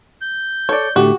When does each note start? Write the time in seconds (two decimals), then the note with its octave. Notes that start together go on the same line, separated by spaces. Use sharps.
0.21 G6
0.69 A4 C#5 D5
0.96 A2 D3 A3 F#4 G4